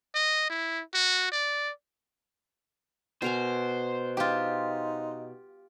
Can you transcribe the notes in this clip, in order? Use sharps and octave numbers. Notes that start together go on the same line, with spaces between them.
D#5
E4
F#4
D5
B2 A#4 C5 G#5
D#4 F4 G4